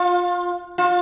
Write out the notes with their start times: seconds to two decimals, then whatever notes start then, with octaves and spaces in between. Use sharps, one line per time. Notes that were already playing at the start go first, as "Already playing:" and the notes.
Already playing: F4
0.78 F4